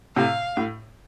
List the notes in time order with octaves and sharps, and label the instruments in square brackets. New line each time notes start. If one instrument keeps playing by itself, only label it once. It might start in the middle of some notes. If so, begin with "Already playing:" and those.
[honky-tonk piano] A2 C3 [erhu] F5
[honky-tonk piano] A2